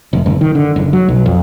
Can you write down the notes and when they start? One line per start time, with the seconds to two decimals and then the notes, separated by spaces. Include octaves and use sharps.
0.13 F1
0.26 F#1
0.41 D#3
0.55 D3
0.76 F#1
0.93 F#3
1.08 B1
1.26 F2